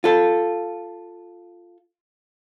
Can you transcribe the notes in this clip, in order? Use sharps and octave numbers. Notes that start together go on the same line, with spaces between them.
F4 A4